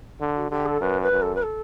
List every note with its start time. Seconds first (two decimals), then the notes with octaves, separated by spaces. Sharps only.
0.21 D3
0.35 F#4
0.50 D3 G4
0.66 A4
0.81 F#2 B4
1.02 B4
1.12 F#2
1.22 A4
1.35 B4
1.43 A4